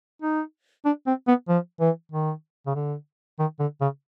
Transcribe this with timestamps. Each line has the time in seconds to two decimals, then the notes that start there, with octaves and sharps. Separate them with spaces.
0.22 D#4
0.85 D4
1.07 C4
1.27 B3
1.48 F3
1.80 E3
2.12 D#3
2.67 C#3
2.75 D3
3.39 D#3
3.60 D3
3.81 C#3